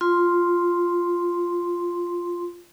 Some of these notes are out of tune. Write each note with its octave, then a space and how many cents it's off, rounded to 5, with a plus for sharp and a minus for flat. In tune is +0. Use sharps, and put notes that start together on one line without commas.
F4 +0 C6 +0